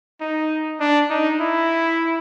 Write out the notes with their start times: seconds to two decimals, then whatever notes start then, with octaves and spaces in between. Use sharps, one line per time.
0.21 D#4
0.80 D4
1.10 D#4
1.40 E4